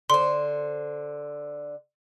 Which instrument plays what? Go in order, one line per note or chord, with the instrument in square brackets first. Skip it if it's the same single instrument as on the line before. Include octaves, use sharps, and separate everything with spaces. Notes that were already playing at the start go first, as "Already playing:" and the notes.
[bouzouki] D3 C5 [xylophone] C6